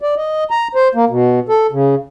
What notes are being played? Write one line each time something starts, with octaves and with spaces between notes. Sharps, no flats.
D5
D#5
A#5
C5
A#3
B2
A4
C#3